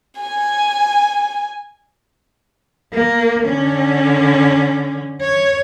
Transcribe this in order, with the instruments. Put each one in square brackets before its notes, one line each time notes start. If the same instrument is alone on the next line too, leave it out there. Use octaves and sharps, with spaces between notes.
[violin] G#5
[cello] A#3
D3 C#4
C#5